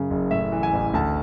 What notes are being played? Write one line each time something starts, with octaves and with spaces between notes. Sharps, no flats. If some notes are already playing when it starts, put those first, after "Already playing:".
Already playing: F#2 C#3
F#1
A2 E5
E3
G#5
A1
D2 A5